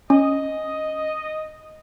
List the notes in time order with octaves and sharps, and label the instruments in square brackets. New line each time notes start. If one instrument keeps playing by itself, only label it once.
[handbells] C#4 [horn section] D#5